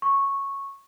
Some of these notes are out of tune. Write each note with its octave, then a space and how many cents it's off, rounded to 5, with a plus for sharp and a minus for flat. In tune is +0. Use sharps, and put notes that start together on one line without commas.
C#6 -10